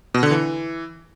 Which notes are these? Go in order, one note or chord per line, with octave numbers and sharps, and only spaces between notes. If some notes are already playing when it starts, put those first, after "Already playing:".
B2
D3
E3